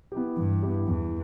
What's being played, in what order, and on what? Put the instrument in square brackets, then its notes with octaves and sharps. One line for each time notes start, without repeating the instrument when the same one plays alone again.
[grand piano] B3 E4 G4
[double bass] G2 [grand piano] E3
[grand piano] B3 E4 G4
[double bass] E2 [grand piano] E3